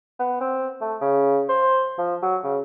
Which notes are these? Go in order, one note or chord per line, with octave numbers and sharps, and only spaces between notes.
B3
C4
A3
C#3
C5
F3
F#3
C#3